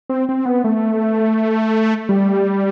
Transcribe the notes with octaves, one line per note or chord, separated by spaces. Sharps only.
C4
C4
B3
A3
G3